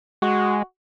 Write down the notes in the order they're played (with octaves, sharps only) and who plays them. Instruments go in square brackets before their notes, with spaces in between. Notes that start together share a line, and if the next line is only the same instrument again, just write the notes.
[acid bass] G#3 [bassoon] F#4